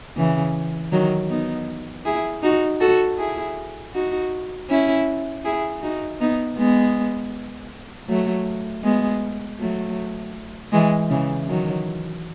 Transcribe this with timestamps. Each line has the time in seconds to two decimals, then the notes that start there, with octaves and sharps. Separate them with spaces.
0.17 C#3 E3
0.92 D#3 F#3
1.30 B3 D#4
2.05 E4 G#4
2.43 D#4 F#4
2.81 F#4 A4
3.18 E4 G#4
3.94 D#4 F#4
4.69 C#4 E4
5.45 E4 G#4
5.82 D#4 F#4
6.21 B3 D#4
6.58 G#3 B3
8.08 F#3 A3
8.84 G#3 B3
9.59 F#3 A3
10.73 E3 G#3
11.10 C#3 E3
11.48 D#3 F#3